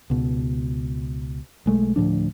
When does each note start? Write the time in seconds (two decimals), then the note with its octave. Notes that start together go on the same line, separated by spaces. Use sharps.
0.10 C#2 B2
1.66 B1 G#3 A3
1.96 D2 A2 F3 D4